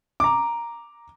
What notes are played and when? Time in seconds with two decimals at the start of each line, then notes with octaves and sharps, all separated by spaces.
0.20 A#5 D6